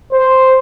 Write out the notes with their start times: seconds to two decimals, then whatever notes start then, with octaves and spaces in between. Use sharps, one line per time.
0.12 C5